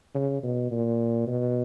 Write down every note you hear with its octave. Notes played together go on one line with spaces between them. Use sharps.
C#3
B2
A#2
B2